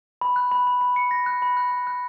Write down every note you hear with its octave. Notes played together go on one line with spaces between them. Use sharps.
B5
F#6
B5
B5
B5
C#7
A#6
F#6
B5
F#6
B5
F#6